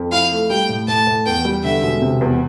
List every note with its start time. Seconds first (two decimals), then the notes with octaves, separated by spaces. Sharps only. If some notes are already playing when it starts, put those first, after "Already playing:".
Already playing: F2
0.12 E4 F5
0.31 A3
0.50 G3 G5
0.69 A2
0.88 A2 A5
1.07 A2
1.26 E2 G5
1.45 G3
1.64 D3 E5
1.82 E1
2.02 C3
2.21 E2